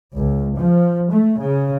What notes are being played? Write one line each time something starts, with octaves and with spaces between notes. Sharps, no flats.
C#2
F3
A3
C#3